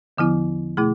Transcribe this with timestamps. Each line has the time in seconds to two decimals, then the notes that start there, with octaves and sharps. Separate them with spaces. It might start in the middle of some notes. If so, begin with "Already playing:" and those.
0.18 E2 D3 F3 B3 E4
0.77 B2 A3 E4 G#4